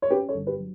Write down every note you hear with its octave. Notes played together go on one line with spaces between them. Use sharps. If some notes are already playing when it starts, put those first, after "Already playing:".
C#5
C#4 G4 B4
A4 C#5
G1
G4 B4
F#3